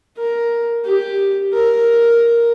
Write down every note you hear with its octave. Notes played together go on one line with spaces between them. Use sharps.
A#4
G4
A#4